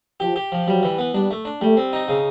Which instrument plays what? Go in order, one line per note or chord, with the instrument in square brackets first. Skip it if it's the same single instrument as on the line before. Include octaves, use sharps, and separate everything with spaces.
[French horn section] F3 [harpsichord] G4
[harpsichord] G4
F3
[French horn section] F#3 [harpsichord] G3
[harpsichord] E3
B3
[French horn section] G3 [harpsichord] D4
[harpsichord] A3
D4
[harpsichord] G3 [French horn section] A3
[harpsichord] C4
D#4
C#3